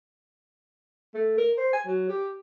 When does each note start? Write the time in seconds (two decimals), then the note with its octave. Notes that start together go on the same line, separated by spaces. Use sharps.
1.14 A3
1.38 A#4
1.57 C5
1.73 G#5
1.86 F#3
2.09 G4